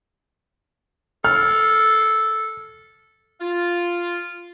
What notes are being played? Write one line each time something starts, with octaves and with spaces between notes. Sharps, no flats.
A4 F6
F4